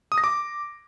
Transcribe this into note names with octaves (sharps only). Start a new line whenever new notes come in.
D#6
A#6
D6